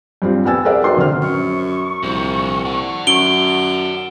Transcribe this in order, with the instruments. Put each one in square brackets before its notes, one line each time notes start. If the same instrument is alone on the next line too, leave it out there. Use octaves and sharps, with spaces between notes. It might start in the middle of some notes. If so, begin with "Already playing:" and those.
[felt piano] G2 C4 F4
G3 B3 G5 G#5 E6 A6
G#4 A#4 C5 D5 E5 F#5
D#4 F#4 B4 G5 C6
B2 D3 C5 F6
[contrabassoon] F#2 [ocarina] C#6
[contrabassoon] C2 [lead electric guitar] A#2 F3
[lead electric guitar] D5 F#5
[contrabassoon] F#2 [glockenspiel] D7 G7